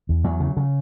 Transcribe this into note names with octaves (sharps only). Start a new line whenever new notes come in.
E2
E2 F#3
C#3
C#3